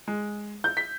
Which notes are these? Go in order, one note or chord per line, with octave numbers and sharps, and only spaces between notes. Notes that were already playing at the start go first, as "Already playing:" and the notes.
G#3
G6
B6